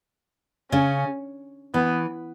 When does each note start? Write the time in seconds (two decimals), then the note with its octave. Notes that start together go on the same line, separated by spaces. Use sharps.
0.71 C#3 C#4
1.74 E3 B3